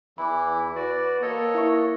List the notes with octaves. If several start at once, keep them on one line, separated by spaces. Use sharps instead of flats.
E2 E3 E4 B5 D6
F#4 B4 D5
A#3 A4 C#5 D#5
E4 E5 C#6